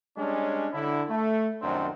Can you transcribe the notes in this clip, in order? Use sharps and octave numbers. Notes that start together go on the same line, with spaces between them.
G3 G#3 C#4 D4
D3 E4
A3
C2 F#2 D#3 C4 D4